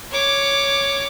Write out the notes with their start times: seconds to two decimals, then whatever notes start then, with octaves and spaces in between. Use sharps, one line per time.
0.11 C#5 D6